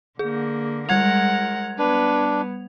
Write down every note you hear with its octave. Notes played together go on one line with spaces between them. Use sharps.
D3 A#3 G#4
G3 G#3 A#4 F#5 G#6 F7
B3 D4 B4